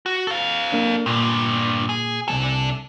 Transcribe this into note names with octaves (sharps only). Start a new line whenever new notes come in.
F#4
A4 F5
A#3 D4
G2 A#2 D3
G#4
C2 F#3 D4 A4 G#5